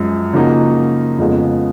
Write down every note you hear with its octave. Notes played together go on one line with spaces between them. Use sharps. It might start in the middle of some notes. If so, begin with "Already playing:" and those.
Already playing: F#2 F3 G#3
C#3 F3 A#3 D#4 F#4
F2 C#3 G#3 B3 F4